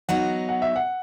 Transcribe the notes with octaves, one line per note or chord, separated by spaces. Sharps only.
F#3 B3 D#4 F#5
F#5
E5
F#5